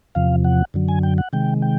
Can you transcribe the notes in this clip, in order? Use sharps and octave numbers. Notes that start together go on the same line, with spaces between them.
E2 C3 F3 F5
F#5
F#2 D3 F#3
G#5
G5
F#5
C3 D#3 G#3 G5
G5